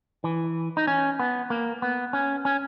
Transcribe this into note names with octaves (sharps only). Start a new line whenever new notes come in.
E3
D#4
C#4
B3
A#3
B3
C#4
C#4